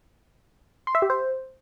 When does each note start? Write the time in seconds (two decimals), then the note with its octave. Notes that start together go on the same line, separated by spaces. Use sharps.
0.87 C6
0.95 E5
1.02 G4
1.10 C5